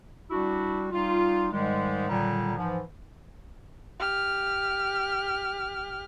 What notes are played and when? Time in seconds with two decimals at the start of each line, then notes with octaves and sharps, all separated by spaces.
0.31 G3 D4 E4 F#4
0.91 G3 D#4 F4
1.51 G#2 D#3 G3 G#3
2.08 A#2 D3 D#3 F#3 G3
2.57 G#2 E3 F3
4.00 G4 F6